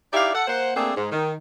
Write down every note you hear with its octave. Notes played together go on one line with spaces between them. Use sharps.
D#4 E4 G4 D5 E5 F5
A4 F#5
A#3 C5 F#5
A3 A#3 C4 D4 G#4
G#2
D#3